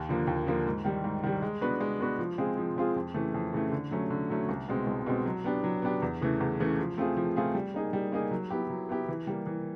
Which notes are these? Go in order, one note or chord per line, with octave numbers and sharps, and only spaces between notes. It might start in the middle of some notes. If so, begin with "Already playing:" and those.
Already playing: D#2
D3 F3 A#3
D#2
D3 F3 A#3
G#2
D#3 G3
G#2
D#3 G3
G#3
B3 D4 F#4 B4
G#3
B3 D4 F#4 B4
F3
G#3 C4 F4 G#4
F3
G#3 C4 F4 G#4
F2
C#3 E3 A3
F2
C#3 E3 A3
D3
F#3 A3 C#4
D3
F#3 A3 C#4
C2
B2 G#3 C4
C2
B2 G#3 C4
F#3
B3 D4 G4
F#3
B3 D4 G4
E2
C#3 E3 A3
E2
C#3 E3 A3
F3
A3 C4 F4 G#4
F3
A3 C4 F4 G#4
G3
A#3 D#4 G#4
G3
A#3 D#4 G#4
F#3
B3 E4 G4
F#3
B3 E4 G4
E3
G3 A#3
E3